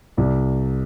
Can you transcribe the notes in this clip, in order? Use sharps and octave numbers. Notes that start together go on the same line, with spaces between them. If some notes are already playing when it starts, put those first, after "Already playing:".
C2 D5